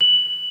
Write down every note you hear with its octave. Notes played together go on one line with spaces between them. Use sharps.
F#7